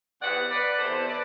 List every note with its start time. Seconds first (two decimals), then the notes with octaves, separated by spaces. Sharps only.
0.21 E2 C3 E3 B3 D5 F#5
0.51 B4 D5
0.78 E2 C3 E3 B3 A4 C5
1.08 B4 D5